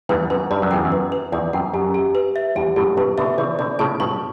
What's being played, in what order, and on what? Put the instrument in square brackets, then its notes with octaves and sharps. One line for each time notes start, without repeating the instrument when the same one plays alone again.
[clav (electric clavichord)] E2 G2 [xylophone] B4
[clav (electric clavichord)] F#2 [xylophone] B4
[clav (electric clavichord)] G2 [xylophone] D5
[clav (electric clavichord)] F#2
[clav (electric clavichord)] E2 [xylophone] G5
[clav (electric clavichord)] F#2
[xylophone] B4
B4
[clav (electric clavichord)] E2 [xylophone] D5
[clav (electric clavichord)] F#2 [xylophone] G5
[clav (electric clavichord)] F#2 [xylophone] G4
[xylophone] G4
B4
E5
[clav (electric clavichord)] E2 G2 [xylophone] G4
[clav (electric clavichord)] F#2 A2 [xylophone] G4
[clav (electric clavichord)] G2 B2 [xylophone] B4
[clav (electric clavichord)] B2 D3 [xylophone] E5
[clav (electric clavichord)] C#3 E3 [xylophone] D5
[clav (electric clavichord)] B2 D3 [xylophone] D5
[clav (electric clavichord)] A2 C#3 [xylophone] A5
[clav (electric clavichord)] G2 B2 [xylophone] C#6